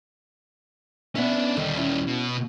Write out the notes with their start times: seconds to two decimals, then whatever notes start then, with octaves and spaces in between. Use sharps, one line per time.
1.15 B3 C#4 D4 E5
1.57 D#2 D3 D#3 G3
1.75 C#4 E4
2.07 B2